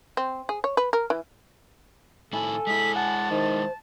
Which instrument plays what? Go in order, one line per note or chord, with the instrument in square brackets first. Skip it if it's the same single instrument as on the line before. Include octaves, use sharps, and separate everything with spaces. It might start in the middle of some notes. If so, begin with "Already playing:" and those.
[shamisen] C4
G#4
C#5
B4
A#4
E3
[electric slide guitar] A2 D#3 E4 [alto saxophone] A4 [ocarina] G#5
[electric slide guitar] G#3 E4 [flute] B6
[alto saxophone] F#5 [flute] A5
[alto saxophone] D#3 [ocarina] C5